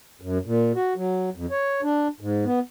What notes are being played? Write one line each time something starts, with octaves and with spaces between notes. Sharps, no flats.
F#2
A#2
F#4
F#3
F2
C#5
D4
G#2
B3